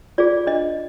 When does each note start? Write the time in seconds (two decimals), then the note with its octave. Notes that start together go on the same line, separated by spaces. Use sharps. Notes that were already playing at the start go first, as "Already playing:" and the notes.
0.18 F4 G#4 D5
0.47 D4 D#5